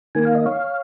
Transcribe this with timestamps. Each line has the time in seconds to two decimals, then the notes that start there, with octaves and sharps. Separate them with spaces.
0.15 D#3 A#3 G#5
0.25 F5
0.35 D#5
0.46 C#5 F5